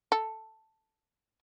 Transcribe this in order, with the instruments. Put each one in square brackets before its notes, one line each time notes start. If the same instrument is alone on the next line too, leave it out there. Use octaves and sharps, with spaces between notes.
[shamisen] A4